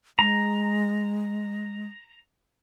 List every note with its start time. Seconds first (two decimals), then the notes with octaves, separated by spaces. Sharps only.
0.19 G#3 A#5